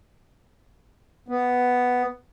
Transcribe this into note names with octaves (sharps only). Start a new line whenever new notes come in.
B3